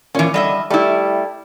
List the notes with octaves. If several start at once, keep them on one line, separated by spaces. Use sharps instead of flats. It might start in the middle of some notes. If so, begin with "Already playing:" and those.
A#2 E3 C#4
D3 G3 D#5 E5
G3 A3 E4